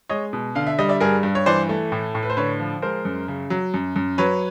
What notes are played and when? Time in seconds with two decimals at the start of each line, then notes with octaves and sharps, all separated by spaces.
0.09 G#3 C#5 D#5
0.33 B2
0.55 D3 F5
0.67 E5
0.79 G3 D#5
0.89 D5 E5
1.00 G2 G#4 A#4
1.23 G2
1.35 C#5
1.46 E3 C5 D5
1.69 A3
1.92 A2
2.15 A2
2.23 B4
2.30 C5
2.37 D3 B4 C#5
2.60 F3
2.82 G#3 A#4 C5
3.05 F#2
3.28 C#3
3.50 F#3
3.74 F#2
3.96 F#2
4.18 F#3 B4 C#5